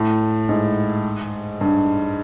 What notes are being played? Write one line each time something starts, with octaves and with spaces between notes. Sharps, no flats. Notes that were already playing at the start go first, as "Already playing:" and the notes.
Already playing: A2
G#2
G2